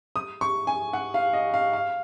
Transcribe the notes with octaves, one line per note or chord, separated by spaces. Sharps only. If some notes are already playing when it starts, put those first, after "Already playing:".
D#6
C#6
G#5
F#5
F5
D#5
F5
F5